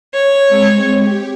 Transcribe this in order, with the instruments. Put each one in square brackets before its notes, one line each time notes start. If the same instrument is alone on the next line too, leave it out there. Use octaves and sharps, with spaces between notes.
[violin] C#5
[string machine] G#3 C4
G4